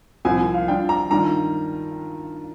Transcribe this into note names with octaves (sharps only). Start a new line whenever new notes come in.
C2 A#2 F3 C4 G#5
G#5
F5
G3 D4 F4 G5
A#5
G2 D#3 G3 D4 F4 A#5